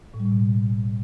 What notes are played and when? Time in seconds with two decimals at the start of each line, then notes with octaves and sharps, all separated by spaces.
0.14 A2
0.20 G3
0.26 A2
0.31 B2